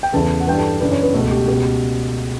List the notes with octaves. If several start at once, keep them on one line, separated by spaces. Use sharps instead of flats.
G5
E2 C#3 E3 A4 A5
F#5
G2 E3 G5
A4 A5
F#2 C#3 E3 D4 D5
C#4 C#5
B3 B4
C#2 B2 A3 A4
G4
C#2 B2 G4